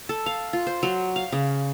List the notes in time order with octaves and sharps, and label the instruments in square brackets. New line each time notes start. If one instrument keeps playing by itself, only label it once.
[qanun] A4
F5
F4
C5
F#3
F5
C#3